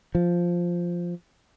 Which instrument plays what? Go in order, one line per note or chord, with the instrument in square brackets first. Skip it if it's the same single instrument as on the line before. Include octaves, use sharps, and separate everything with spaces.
[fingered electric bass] F3